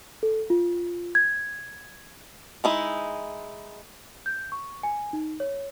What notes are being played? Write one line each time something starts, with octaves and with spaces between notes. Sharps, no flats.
A4
F4
G#6
G#3 D#4 E4
G6
C#6
G#5
D#4
C#5